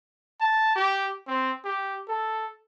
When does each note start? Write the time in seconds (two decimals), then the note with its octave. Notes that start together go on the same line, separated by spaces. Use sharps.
0.41 A5
0.76 G4
1.27 C4
1.65 G4
2.08 A4